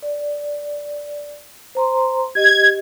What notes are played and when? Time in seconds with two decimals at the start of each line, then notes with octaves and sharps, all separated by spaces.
0.03 D5
1.75 C5 A#5 C6
2.35 G4 D#5 G#6